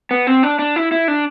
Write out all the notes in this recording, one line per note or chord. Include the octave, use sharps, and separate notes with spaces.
B3
C4
D4
D4
E4
E4
D4